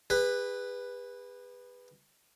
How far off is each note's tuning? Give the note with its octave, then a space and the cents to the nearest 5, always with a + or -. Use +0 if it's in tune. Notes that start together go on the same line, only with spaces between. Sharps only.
G#4 -40 B4 +0